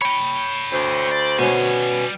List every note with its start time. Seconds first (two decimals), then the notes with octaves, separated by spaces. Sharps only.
0.02 C#5 G5 B5
0.72 D2 C5
1.12 D5
1.39 B2 G3 C#4 G#5